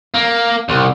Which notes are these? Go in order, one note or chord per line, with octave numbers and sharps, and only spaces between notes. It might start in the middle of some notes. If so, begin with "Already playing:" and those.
A#3
C2